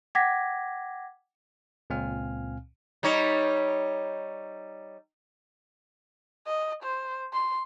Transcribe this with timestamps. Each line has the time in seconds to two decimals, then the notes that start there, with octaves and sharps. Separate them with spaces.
0.15 F#5 G5 D6 G#6 A#6 B6
1.90 C#2 A#2 C4 F5 G#5 F6
3.03 G3 D#4 C#5
6.47 D#5
6.83 C5
7.33 C6